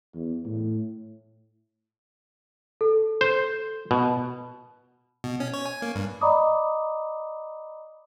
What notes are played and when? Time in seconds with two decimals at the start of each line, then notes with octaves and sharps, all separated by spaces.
0.14 E2
0.46 A2
2.81 A4
3.21 C5
3.91 B2
5.24 B2
5.40 C#4
5.54 C#5
5.66 G#5
5.82 A#3
5.95 G2
6.21 D5 D#5 A#5 B5 D6 D#6